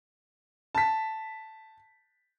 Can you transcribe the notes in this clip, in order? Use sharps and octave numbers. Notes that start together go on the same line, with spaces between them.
A5 B6